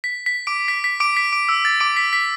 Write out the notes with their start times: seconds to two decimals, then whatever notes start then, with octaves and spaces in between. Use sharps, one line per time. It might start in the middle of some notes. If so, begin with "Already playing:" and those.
0.04 B6
0.26 B6
0.47 D6 D7
0.68 B6
0.84 B6
1.00 D6 D7
1.17 B6
1.33 D6 D7
1.49 E6
1.65 A6
1.80 D6 D7
1.97 B6
2.13 B6